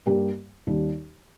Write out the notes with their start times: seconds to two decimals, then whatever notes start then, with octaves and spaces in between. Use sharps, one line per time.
0.06 G2 G3 A#3 G4
0.67 D#2 D#3 G3